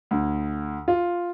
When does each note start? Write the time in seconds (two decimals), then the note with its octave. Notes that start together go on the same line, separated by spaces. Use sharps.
0.11 D2
0.88 F4